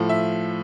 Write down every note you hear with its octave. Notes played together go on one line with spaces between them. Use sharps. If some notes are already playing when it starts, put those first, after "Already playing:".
Already playing: A2 F3
E5